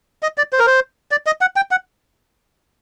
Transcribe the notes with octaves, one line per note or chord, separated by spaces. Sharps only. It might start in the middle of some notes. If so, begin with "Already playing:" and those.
D#5
D5
C5
A#4
C5
D5
D#5
F#5
G5
F#5